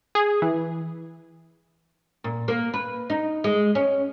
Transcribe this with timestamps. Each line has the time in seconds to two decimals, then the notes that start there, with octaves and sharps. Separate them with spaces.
0.15 G#4
0.42 E3
2.24 A#2
2.48 A#3
2.74 B4
3.10 D#4
3.44 G#3
3.75 C#4